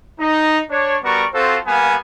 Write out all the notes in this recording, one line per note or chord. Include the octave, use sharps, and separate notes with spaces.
D#4
D4 C#5
G3 B3 F#4 A#4 D5 C#6
C4 F4 F#4 A4 C5
G3 A#3 B3 F5 G#5